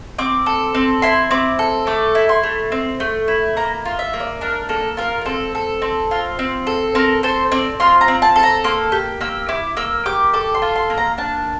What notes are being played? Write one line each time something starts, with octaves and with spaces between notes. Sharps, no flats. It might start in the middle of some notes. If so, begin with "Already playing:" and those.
C4 D6
A4
C4
E4 C6
C4 D6
A4
A3 D6
E4
C6
A3
C4
A3
E4
A#3 A#5
F4
E5
A#3
D5
D4 A#4
A#3 A4
F4 A#4
A#4
C4 A4
A4
C4
F4
C4
A4
C4 A#4
A4 C5
C4 D5
F4 C6
A#5
C4
A5
A4
A#5
A#3 C6
G4
A#3 E6
E4 D6
A#3 E6
G4 D6
A4 D6
C6
F4
C6
A#3
A#5
D4 A5